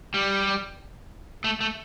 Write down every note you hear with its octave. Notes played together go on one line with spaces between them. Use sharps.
G3
A3
A3